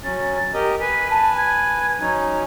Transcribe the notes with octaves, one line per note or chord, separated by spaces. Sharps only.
F#3 C#4 A6
G4 A#4 D#5
B4 G#5 B6
A5
G#6
F#3 C#4 D#4